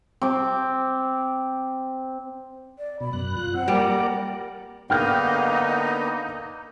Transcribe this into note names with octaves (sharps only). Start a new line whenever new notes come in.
C4 D6
D5
B2 B5
F#2 F#6
F4 F#6
C4 F#5
G3 A#3 A#4 D5
D3 A#3 B3 D#4 G5 F6 G6